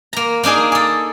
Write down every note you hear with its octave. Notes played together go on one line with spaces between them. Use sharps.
A#3 A#5
A#3 D4 D#4 G#4
G#4 A4